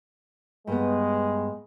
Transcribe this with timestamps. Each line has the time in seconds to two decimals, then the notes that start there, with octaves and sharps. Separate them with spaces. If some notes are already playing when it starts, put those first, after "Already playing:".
0.67 G2 G#3 B3